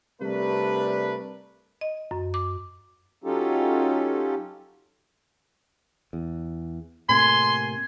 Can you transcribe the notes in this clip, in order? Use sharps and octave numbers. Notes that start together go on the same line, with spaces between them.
C3 G3 A3 D4 A#4 B4
D#5
F#2
D6
F#3 C#4 D#4 F4 G4 A4
E2
A2 C3 A#3 G#5 C6